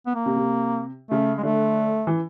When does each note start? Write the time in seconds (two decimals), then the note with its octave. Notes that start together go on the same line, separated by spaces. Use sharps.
0.07 B3
0.15 A#3
0.26 C3
0.36 C3
1.11 C#3 A3
1.38 G#3
1.43 D3 A3
2.07 E3